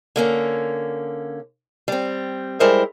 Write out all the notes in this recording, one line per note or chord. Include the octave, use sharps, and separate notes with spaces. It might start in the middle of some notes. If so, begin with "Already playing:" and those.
D3 A#3 C#4
G3 C4
G3 G#3 E4 A#4 C5